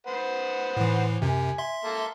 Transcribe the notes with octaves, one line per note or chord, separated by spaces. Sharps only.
B4 C5 F#5
A2 E3
F#2 C3 G#5
E5 C6
A#3 A4